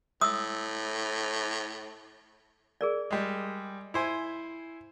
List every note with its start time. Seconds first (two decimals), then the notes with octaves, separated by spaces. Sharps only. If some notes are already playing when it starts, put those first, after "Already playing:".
0.21 A2 D#6 E6
2.81 G#4 A#4 D5
3.11 G3 G#3
3.94 E4 C5 G#5